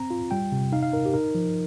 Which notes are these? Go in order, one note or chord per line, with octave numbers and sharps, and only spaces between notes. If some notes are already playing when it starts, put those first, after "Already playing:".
Already playing: C4 A#5
F4
G3 G5
C3
D#4 F5
F5
D#4 A#4
G4
D#4 A#4
F3